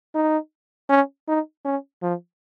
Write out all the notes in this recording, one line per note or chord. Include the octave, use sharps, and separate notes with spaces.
D#4
C#4
D#4
C#4
F3